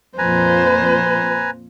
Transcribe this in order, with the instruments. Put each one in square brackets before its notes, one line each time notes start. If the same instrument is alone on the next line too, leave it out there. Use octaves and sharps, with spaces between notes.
[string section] F2 A#2 [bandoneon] B4 G#5 A#5 [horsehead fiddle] C5